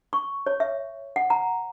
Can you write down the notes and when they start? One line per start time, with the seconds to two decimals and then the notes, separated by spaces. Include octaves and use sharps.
0.13 C#6
0.47 C#5
0.60 E5
1.16 F#5
1.30 A#5